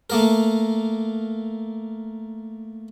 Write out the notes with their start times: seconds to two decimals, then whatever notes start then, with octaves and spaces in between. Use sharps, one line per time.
0.10 A3 A#3 A#4